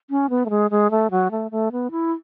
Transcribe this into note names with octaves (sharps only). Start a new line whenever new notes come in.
C#4
B3
A3
G#3
G#3
A3
F#3
A3
A3
B3
E4